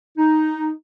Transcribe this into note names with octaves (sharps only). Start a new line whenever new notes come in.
D#4